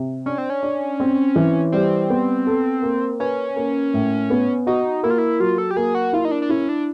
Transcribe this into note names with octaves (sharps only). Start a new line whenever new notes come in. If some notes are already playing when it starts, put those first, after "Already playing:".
Already playing: C3
C#4 D4
C4
C#4
D4
C4
E3
G3 C4
B3
A4
A#3
C#4 B4
A#3
A2
B3
D#4 F#4
A#3 E4
F4
E4
F#3 F4
A4
G4
A#3 G#4
F#4
E4 F4
D#4
D4
D4
C#4 E4
D4